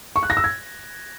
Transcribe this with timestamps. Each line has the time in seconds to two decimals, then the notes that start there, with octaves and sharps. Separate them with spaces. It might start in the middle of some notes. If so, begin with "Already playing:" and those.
0.16 C#6
0.23 F#6
0.30 A#6
0.37 E6
0.44 G#6